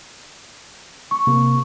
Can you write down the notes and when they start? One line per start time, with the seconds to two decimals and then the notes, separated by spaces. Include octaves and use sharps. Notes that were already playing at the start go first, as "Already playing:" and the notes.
1.11 C#6
1.27 C3 A#3